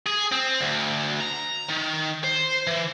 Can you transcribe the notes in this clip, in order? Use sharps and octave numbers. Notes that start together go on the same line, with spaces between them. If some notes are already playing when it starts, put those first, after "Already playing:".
G#4
C4
D2
A#5
D#3
C5
E3